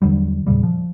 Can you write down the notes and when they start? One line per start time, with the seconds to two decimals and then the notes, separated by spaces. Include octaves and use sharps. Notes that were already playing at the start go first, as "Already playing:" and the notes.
0.02 E2 D3 F#3 G3
0.47 E2 A#2 C#3 G3
0.63 F3